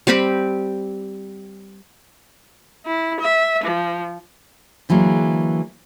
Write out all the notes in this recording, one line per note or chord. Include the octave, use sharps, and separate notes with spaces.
G3 C4 G4 B5
E4
E5
F3
D3 E3 F#3 G#3 A#3